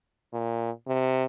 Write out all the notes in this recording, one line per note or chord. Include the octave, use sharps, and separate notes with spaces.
A#2
C3